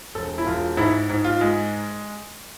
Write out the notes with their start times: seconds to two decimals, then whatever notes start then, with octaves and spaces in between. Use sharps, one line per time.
0.15 E1 A4
0.38 E4
0.46 E1 F4
0.77 G#2 E4
1.09 G#2
1.24 F4
1.41 G#3